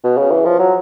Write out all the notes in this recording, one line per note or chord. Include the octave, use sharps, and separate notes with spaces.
B2
C#3
E3
F3
F#3